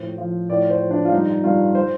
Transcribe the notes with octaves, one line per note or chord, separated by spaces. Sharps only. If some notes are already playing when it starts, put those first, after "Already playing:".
Already playing: A2 F3 C5
F3
A2 D5
C5
F3
D4
F4
G2 D#4
G2 F4
C5